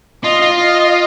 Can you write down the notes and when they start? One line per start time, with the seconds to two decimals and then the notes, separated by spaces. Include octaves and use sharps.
0.24 F4 D#5
0.42 F4
0.61 D#5